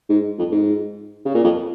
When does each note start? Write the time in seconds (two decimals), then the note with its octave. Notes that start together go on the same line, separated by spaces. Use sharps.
0.09 G#2
0.38 F2
0.52 G#2
1.25 C#3
1.34 A#2
1.44 F2